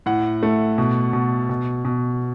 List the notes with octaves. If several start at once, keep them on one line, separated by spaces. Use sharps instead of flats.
A2 F#5
A3
B2
B2
B2
B2